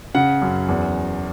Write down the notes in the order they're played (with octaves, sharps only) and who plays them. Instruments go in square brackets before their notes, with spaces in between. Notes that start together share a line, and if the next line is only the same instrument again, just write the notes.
[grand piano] C#3 F#5
F#2
E2